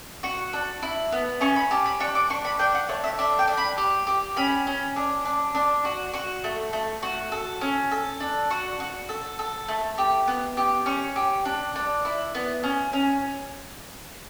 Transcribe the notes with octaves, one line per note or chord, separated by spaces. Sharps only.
F#4 C#6
D4
E4
B3
C#4 C#6
B5
G4 A5
B5
D4 C#6
D6
D4 C#6
B5
D4 G5
F#5
A3 C#5
E5
D4 E5
G5
D4
B5
G4
G4
C#4 B5
C#4
D4
D4
D4
F#4
F#4 C#6
A3
A3
F#4
A4
C#4
A4
D4
F#4 C#6
F#4
A4
A4
A3
G4
B3
G4
C#4 C#6
G4
D4
D4
E4
B3
C#4
C#4